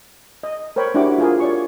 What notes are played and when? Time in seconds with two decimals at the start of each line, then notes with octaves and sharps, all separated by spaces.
0.43 D#5
0.76 A#4 C5 C#5 G5 B5
0.94 D4 E4 F#4 G4 F#5 D6
1.18 F4 G#4 A#4
1.40 C#5 D5 C#6